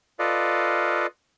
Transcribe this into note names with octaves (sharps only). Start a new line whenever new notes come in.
F4 A4 B4 D5 D#5 F5